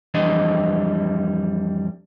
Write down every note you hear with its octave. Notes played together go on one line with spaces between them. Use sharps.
F2 E3 G3 D4 D#5